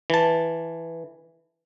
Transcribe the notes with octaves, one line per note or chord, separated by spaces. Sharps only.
E3 A5